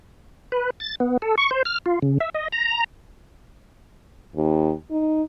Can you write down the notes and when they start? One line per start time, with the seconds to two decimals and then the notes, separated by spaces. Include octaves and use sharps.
0.52 B4
0.80 A6
1.00 B3
1.22 A4
1.38 C#6
1.51 C5
1.65 F6
1.86 F4
2.02 C#3
2.20 E5
2.35 D#5
2.52 A#5
4.36 D#2
4.91 D#4